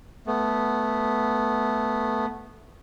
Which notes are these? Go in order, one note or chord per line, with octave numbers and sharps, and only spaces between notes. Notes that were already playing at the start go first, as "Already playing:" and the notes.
A3 B3